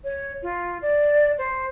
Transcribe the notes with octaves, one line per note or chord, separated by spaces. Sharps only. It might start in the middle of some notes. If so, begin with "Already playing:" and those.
C#5
F4
D5
C5